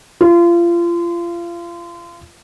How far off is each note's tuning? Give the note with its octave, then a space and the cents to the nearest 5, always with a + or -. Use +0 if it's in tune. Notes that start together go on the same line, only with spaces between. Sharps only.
F4 -30